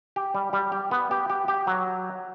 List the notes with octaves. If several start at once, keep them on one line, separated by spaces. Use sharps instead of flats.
G4
G3
G3
G4
B3
G4
G4
G4
F#3